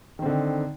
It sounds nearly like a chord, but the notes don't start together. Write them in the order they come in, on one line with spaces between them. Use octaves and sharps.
D#3 C4 D3 D#4